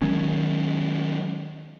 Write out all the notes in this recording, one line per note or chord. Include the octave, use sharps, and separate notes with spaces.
D#3 F#3 G#3 C#4